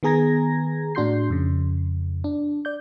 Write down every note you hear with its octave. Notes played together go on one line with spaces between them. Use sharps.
D#3 B3 G#4 A#5 G#6 A#6
A2 D4 F#4 C6 G6 C7
F2 C#3
D4
D5 G6